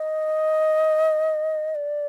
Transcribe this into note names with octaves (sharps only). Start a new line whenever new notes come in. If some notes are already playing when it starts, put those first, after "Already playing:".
Already playing: D#5
D5